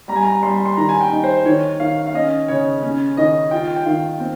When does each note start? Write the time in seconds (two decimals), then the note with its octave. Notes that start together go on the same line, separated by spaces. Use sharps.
0.08 G3 A#5
0.16 G#5
0.24 A#5
0.43 G3 C6
0.66 C6
0.77 D#3 A#5
0.89 G#5
1.01 G5
1.12 D#4
1.24 C5
1.46 D#3 C#5
1.80 D#3 F5
2.06 F5
2.14 C#4 D#5
2.48 C#3 C#5
2.83 C#4
3.17 D#3 D#5
3.51 F4 G5
3.76 G5
3.86 D#3 F5
4.20 C4